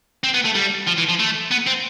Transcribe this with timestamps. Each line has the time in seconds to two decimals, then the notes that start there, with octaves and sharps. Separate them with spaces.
0.24 C4
0.34 B3
0.45 A3
0.55 G3
0.87 F3
0.98 E3
1.09 F3
1.19 A3
1.51 B3
1.67 C4